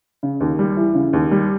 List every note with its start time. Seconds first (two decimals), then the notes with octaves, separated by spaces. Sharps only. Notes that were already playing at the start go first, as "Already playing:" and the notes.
0.23 C#3
0.40 D#2
0.59 G3
0.77 E3
0.95 C#3
1.13 D#2
1.31 G3